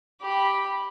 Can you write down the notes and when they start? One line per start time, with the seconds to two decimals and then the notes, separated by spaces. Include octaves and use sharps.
0.21 G4 B5